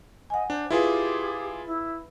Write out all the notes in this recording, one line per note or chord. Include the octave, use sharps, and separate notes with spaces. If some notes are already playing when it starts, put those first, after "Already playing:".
D#5 F#5 G#5
D4 C5
E4 F4 G4 G#4 B4 F5
E4